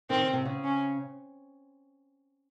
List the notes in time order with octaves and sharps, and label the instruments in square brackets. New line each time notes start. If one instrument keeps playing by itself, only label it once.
[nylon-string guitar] D#3 [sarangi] C4
[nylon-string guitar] C#3
C3
C#3
[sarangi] C#4